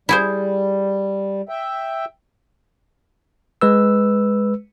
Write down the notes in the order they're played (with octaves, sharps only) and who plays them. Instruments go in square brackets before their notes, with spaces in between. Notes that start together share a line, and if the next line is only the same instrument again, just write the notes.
[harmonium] G3 [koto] E4 G#4 C5
[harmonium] E5 G5
[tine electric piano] G#3 B4 E6